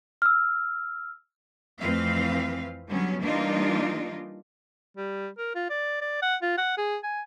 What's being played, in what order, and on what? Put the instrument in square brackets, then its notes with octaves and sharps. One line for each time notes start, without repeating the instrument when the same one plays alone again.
[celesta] E6 F6
[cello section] F2 E3 A3 C4 B4 F5
D3 F#3 G3 B3 C#4
E3 G3 A#3 D4 D#4 F4
[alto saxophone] G3
A#4
F4
D5
D5
F#5
F4
F#5
G#4
G#5